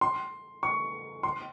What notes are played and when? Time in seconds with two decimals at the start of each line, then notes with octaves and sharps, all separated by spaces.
0.01 C6
0.63 C#6
1.23 C6